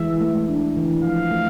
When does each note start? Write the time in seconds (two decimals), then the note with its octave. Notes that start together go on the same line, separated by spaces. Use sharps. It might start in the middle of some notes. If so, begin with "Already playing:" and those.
Already playing: E3 G#3 E5
0.21 A3
0.49 D4
0.76 E3
1.04 F3 F5
1.31 A3